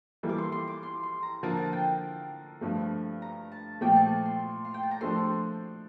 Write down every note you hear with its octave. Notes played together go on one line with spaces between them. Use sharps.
E3 G3 A#3 F4 A4
D6
C6
C6
D6
C6
C6
A#5
D3 F3 A#3 F4 A#4 A5
A5
G5
G2 F3 A3
A#5
A5
A#2 F3 A3 G5
A5
C6
F5
G5
A5
A#5
F3 A3 D4 A4 C5 C6